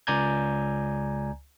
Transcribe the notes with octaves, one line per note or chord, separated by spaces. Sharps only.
C#2 D5 G#5 A#5 G6 G#6